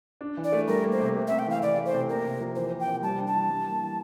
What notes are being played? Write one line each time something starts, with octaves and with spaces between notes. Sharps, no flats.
D4
E3
D5
A3
G3 A#4
A#3
C5
C3
A3
E5
C4
G5
E3 F5
E3 D5
A3
C5
C3
A#3 A#4
C3
F3
E3 C5
A#3
G5
C3
G3 A5
D4
A5
E3
G3
A#3
E3